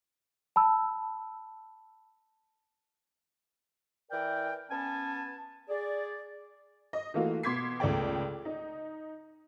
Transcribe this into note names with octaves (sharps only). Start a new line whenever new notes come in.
A5 B5 E6
E3 A#4 D5 G5
B3 C#4 G#5 A5
G#4 D5
D#5
E3 A3 A#3 F4 F#4
B2 C6 D6 G#6 B6 C7
C#2 A3 D5 G5
D#4